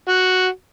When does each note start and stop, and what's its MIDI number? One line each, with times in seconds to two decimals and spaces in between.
0.08 0.47 66